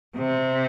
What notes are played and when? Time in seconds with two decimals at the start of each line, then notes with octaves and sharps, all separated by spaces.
0.17 C3